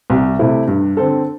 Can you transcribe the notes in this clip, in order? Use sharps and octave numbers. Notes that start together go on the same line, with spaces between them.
C2
C3 A3 E4
G2
D3 C4 A4